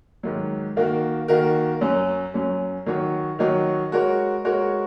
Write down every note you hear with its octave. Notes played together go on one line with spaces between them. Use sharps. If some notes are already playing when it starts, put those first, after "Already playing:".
G#2 D#3 F#3
D#3 A#3 F#4 A#4
D#3 A#3 F#4 A#4
F#2 F#3 C#4
F#2 F#3 C#4
D#3 F#3 D#4 F#4 C#5
D#3 F#3 D#4 F#4 C#5
G#3 F#4 A#4 C#5
G#3 F#4 A#4 C#5